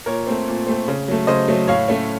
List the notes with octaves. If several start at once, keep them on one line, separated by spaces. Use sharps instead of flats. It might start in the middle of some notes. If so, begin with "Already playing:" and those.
A#2 A#4 C#5
A3 C4
A#2
A3 C4
C#3
F#3 A3
C#3 C5 D#5
F#3 A3
A2 C#5 F5
A3 C#4